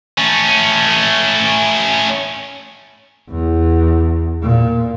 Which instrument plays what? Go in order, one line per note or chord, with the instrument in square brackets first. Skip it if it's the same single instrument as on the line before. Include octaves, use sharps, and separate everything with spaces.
[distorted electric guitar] A3 C#4
[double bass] E2
A#2